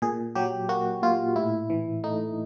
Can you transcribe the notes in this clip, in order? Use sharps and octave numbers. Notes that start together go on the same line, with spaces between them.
A#2 G#4
F#3 G4
A#3 F#4
A#2 F4
A2 E4
E3
A3 D#4